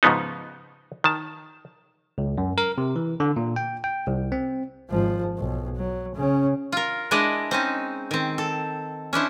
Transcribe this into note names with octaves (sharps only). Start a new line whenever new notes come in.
G#2 C#3 F3 B3 D#4
D#3 A5
C#2
F#2
A#4
C3
E3
D3
A#2
G5
G5
C2
C4
G#1 F3
B1
F#3
C#3 C#4
F4 A#4
G#3 D4 E4 D5 D#5
C4 C#4 D#4
D#3 C4
A4
C#4 D4 E4 C5